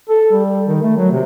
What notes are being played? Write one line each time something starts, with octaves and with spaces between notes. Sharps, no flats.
A4
G3
D#3
A3
F#3
C3